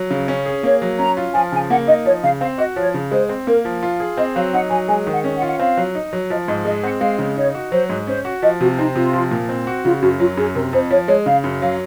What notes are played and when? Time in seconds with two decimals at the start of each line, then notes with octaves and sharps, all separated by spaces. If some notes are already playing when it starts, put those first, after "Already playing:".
Already playing: F#3
0.11 C#3
0.28 C#4
0.46 G#4
0.63 A#3 C#5
0.82 F#3
0.99 C#4 A#5
1.17 F4
1.34 F3 G#5
1.52 C#3 G#5
1.70 A#3 F#5
1.87 D#4 D#5
2.05 F3 C#5
2.23 C#3 F5
2.41 C4 F5
2.58 F#4 D#5
2.76 F3 C#5
2.94 C#3
3.11 G#3 C5
3.29 C4
3.47 A#3 A#4
3.65 F3
3.83 F4
4.00 G#4
4.17 C4 D#5
4.36 F#3 F5
4.53 D#4 F#5
4.71 F#3 G#5
4.88 G#3 G#5
5.07 D#3
5.12 F#5
5.24 C#4
5.36 F#5
5.42 F4
5.48 F#5
5.59 C4 F5
5.77 F#3
5.95 D#4
6.13 F#3
6.30 F3 D#5
6.48 G#2 D#5
6.65 G#3 D#5
6.83 C4 F#5
7.01 G#3 F5
7.19 C#3
7.36 D#4 C#5
7.55 F#4
7.72 F#3 C5
7.89 G#2
8.07 C#4 C5
8.25 F#4
8.42 F3 D#5
8.61 C3 F#4
8.79 C4 D#4
8.96 C3 F4
9.13 F3
9.31 A#2
9.49 C4
9.67 F#4
9.84 C#3 F4
10.02 F#2 F#4
10.20 F#3 F4
10.37 F#2 G#4
10.55 C3 A#4
10.73 F2 C5
10.91 F3 C#5
11.08 G#3 C#5
11.26 C#3 F5
11.44 F#2
11.61 F#3 F5